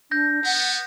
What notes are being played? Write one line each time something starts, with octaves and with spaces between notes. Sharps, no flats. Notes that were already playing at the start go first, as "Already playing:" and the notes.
D4 G6 A#6
B3 F#5